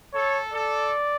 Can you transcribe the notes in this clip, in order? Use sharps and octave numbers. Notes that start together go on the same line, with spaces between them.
A4 C#5
A4 D5